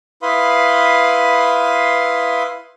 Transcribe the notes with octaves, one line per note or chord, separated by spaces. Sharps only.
E4 B4 F5 B5 C6 D#6